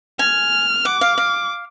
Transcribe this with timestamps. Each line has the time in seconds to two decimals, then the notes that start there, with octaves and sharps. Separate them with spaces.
0.19 G#5 F6
0.85 F#5 D6
1.01 F5
1.18 F5